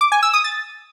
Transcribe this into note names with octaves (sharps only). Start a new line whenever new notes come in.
D6
G#5
E6
D#6
A6